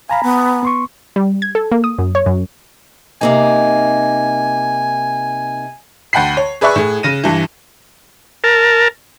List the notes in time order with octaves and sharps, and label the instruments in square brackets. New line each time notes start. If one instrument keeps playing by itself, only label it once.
[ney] F5 [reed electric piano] G#5 A#5 B5
[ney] B3
[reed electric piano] B3 C6 C#6
[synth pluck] G3
G#6
A4
A#3
D#6
F#2
C#5
F#2
[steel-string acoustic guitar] C3 A#3 D#4 [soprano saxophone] G#5
[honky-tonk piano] D2 F#5 G5 B5 C7
C#5
G#4 B4 D5 E5 C#6 F#6
A2 G#4
C#3 A#6 D#7
G2 E3
[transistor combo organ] A#4 A5